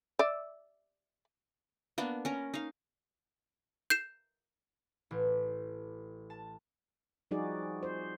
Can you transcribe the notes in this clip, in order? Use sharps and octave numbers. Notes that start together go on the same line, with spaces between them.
D5 E5
A#3 B3 D4
C#4 A#4
D#4 F5
G6 C7 E7
A1
A5
F3 G3 D#4 F#4 G#4 D5
C5